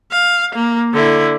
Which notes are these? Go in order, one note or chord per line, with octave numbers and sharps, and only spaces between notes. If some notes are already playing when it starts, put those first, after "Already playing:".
F5
A#3
D3 E4